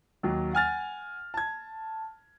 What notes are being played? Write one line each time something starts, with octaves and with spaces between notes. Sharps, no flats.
D#2 F#3
F#5 G#5 F6 A6
A5 G#6